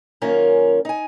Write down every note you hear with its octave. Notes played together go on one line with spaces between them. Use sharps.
F#2 D#3 A#3 C#4 F4 A#4
D#4 G#5